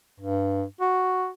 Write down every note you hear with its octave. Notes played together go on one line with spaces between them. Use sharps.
G2
F#4